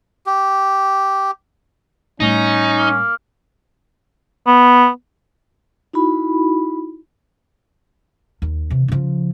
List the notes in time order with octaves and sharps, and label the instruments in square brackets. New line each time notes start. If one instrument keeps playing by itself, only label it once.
[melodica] G4
[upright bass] A2 G3 [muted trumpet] C#4 [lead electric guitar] D#4
[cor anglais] A#3
B3
[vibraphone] D#4 E4 F#4 B5
[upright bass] D#2
C3 E3
C#3 F3